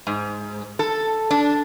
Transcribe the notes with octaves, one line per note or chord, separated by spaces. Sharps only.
G#2
A4
D4